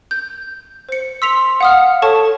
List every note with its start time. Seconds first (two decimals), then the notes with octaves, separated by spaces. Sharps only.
0.11 G6
0.89 C5 C#7
1.22 C6 E6 B6 F7
1.60 F5 F#5 D#6 F6
2.02 A4 C#5 A5 C#6